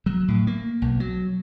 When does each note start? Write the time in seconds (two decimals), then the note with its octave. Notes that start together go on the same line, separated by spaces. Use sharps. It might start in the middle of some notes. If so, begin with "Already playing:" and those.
0.06 F#3
0.28 A2
0.47 A#3
0.82 B1
1.00 F#3